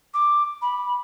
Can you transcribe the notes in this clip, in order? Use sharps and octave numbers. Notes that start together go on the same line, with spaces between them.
D6
B5